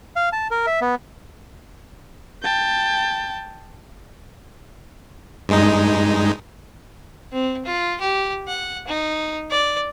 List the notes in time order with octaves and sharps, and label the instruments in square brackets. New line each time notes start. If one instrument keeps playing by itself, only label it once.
[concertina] F5
A5
A#4
E5
B3
[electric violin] G5 A5
[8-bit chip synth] G2 G#3 D#4
[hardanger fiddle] C4
F4
G4
F#5
D#4
D5